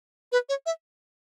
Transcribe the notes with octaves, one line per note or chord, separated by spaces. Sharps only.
B4
C#5
E5